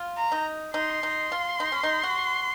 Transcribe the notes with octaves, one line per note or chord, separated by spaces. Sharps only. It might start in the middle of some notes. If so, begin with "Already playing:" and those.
Already playing: F4
A#5
D#4
D#4 C6
D#4
F4
D#4
C#4
D#4
F#4